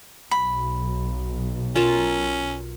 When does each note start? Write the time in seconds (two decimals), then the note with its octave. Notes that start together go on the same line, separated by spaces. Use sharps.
0.31 B1 B5
1.75 C#4 F4 A#4 A5